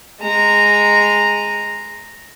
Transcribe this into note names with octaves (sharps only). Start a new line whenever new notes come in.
G#3 A#5